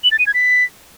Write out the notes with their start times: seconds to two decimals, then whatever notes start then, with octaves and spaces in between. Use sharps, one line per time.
0.04 F#7
0.11 A6
0.19 D#7
0.27 G#6
0.34 B6